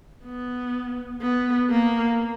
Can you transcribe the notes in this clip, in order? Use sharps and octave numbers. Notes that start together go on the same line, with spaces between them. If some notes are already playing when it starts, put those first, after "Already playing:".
B3
B3
A#3